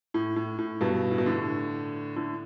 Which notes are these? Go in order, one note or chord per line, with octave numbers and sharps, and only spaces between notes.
A2
A2
A2
G2 B2
A2
B2
A2 D3
A2 D3